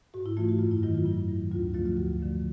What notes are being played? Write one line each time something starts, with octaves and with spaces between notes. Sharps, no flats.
G#2 F#4
E4
E3 A3 F4
F#4
F#2 F4
E4
D#3 F#3 E4
F4
F#2 E4
D#3 F#3
D2 F4
D3 F3 A3 F4
F4
D2 F#4
D3 F3 A3